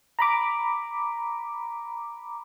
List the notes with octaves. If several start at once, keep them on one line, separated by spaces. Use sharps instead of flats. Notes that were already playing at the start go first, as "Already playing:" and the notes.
A#5 B5 D6